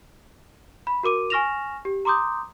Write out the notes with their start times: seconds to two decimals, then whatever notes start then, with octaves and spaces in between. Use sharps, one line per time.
0.87 B5
1.03 F#4 A#4 D6 D#7
1.30 G#5 C#6 F6 A#6 E7 F7
1.85 G4
2.05 A#5 C6 D6 D#6 G6